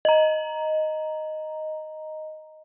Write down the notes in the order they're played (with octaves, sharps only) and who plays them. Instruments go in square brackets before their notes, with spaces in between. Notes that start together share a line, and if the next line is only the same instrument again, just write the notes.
[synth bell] D#5 A#5